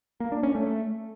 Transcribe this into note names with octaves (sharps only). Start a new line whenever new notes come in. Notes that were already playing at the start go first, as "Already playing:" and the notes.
A#3
D4
C#4
A3